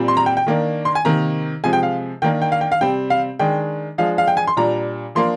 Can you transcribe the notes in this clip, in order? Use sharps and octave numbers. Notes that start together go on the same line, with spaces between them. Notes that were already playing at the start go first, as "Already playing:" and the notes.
Already playing: A#2 G3 C4
C6
A#5
G5
G5
D#3 A#3 D4
C6
G#5
C3 D#3 A#3 A#5
C3 F3 G#3 G#5
G5
F5
D#3 A#3 D4 G5
G5
F5
G5
F5
C3 G3 C4 G5
F5
D#3 G#3 D4 G5
F3 G#3 D4 F5
F5
G5
G#5
C6
A#2 G3 D4 A#5
F3 A#3 D4 C6